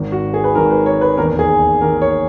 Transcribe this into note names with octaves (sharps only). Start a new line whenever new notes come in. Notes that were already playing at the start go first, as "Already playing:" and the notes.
Already playing: G#1 G#2 D#3
F#4
G#4
B4
G#1 G#2 D#3 A#4
B4
C#5
B4
E1 D#2 D#3 A#4
G#4
E1 D#2 D#3 A#4
C#5